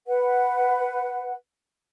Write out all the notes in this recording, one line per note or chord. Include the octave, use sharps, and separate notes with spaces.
B4 F#5